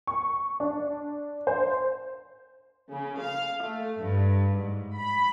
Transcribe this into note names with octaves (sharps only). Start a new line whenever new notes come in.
C#6
D4
C5
C#3
F5
A3
G2
G#2
B5